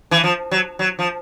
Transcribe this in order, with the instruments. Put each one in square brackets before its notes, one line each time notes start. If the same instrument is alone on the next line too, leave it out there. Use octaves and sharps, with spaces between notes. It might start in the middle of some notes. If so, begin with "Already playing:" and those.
[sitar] E3
F3
F#3
F#3
F3